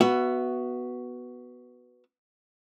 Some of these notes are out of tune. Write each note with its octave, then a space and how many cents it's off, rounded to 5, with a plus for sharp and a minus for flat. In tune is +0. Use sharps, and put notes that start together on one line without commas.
B3 +0 F#4 +5 E5 +30